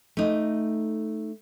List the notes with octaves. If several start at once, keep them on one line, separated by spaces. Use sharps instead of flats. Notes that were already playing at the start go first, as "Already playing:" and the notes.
A3 D#4